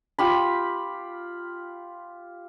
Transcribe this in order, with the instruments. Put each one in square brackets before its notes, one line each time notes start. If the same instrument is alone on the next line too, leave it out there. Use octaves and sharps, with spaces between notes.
[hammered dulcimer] F4 G4 B5